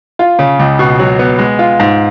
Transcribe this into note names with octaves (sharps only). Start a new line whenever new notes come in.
F4
C#3
C#2
B2
F#3
B3
G#3
F4
G#2